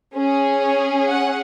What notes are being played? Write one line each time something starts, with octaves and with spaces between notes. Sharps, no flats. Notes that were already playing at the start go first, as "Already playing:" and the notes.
C#4 G#4
C#5
F#5